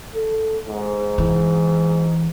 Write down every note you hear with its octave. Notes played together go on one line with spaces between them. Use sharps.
A4
G#2
E3